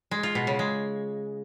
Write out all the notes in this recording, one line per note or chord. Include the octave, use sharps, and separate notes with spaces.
G#3
F4
B2
C#3
G#3